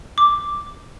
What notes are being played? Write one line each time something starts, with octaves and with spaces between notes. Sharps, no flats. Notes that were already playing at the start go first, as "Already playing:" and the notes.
D6